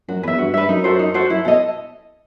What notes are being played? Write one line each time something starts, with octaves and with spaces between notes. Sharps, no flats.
F#2 F#4
E2 B4 E5
G2 F#4
G2 B4 E5
F#2 D#4
F#4 A4 C5
D#4
F#4 A4 C5
F#2 E4
B2 A4 D#5